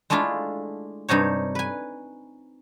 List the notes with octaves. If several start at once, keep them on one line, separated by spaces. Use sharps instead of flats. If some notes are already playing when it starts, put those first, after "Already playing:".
G#3 A3 D4 E4 F4
G2 C3 D#4 C#5
B4 G#5